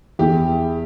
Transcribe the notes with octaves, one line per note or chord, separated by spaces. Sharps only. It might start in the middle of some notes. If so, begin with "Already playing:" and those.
E2 G4